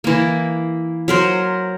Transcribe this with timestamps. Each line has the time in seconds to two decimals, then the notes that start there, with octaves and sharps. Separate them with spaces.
0.04 E3 A#3
1.08 F#3 A#4 C5